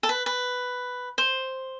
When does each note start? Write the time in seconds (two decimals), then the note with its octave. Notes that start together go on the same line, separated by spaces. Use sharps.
0.03 A4
0.09 B4
0.26 B4
1.18 C5